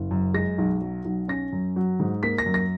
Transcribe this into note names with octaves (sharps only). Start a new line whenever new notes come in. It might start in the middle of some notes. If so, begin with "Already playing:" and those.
Already playing: F#1
F#2
G#3 A#6
B1
F#3
B1
C#4 A#6
F#2
F#3
G#2
A#3 B6
A#6
F#2
A#6